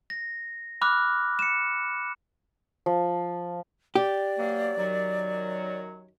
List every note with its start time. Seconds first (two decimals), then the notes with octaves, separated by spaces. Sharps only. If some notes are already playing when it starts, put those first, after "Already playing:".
0.10 A#6
0.81 B5 D6 F6 F#6
1.39 C#7 E7
2.86 F3
3.95 G4 D5
4.38 B2 F#3 A#3
4.78 F#2 D#3 F#3